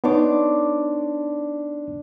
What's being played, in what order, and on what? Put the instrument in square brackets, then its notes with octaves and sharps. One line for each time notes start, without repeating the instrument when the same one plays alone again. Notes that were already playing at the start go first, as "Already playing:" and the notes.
[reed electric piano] B3 D#4 C#5 [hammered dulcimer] D4 C6 D6